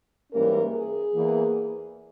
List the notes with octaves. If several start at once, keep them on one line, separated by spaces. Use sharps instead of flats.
G#2 E3 G3 A#3 C#4 A#4
G#4
E2 E3 A#3